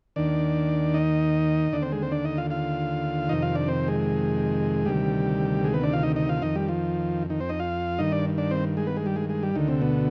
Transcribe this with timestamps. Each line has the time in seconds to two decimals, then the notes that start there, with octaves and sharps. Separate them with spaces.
0.16 D#2 D#3 D4 D5
0.94 D#4 D#5
1.72 D#2 D3 D4 D5
1.82 C4 C5
1.92 G#3 G#4
2.02 C4 C5
2.12 D4 D5
2.24 D#4 D#5
2.37 F4 F5
2.51 F4 F5
3.29 F2 C3 D#3 D#4 D#5
3.42 F4 F5
3.55 D4 D5
3.68 C4 C5
3.88 G#3 G#4
4.85 D2 C3 D#3 G3 G4
5.64 G#3 G#4
5.74 B3 B4
5.83 D4 D5
5.93 F4 F5
6.03 D#4 D#5
6.16 D#4 D#5
6.29 F4 F5
6.42 F2 D#3 D#4 D#5
6.55 G3 G4
6.68 F3 F4
7.30 D#3 D#4
7.40 C4 C5
7.49 D#4 D#5
7.60 F4 F5
7.99 G2 D#3 D#4 D#5
8.12 D4 D5
8.38 D4 D5
8.51 C4 C5
8.77 G#3 G#4
8.87 B3 B4
8.97 G#3 G#4
9.06 G3 G4
9.16 G#3 G#4
9.29 G#3 G#4
9.43 G3 G4
9.55 D2 D3 D#3 D#4
9.68 C3 C4
9.82 B2 B3